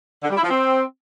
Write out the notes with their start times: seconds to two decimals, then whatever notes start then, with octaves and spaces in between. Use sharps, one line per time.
0.23 D3
0.30 G3
0.37 E4
0.43 F3
0.50 C4